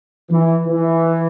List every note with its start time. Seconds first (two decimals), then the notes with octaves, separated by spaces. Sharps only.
0.30 E3
0.67 E3